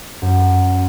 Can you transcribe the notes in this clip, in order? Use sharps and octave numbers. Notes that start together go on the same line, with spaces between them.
F#2